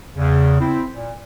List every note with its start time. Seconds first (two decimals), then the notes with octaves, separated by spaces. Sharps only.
0.17 E2 C#3
0.60 C4 E4
0.93 A#2